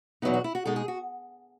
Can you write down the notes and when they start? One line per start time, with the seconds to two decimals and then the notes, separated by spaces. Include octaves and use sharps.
0.22 E2 B2 F#3 B3 D#4 E4
0.34 F#4
0.44 E4
0.55 F#4
0.66 B2 G#3 D#4 A4
0.76 G#4
0.88 F#4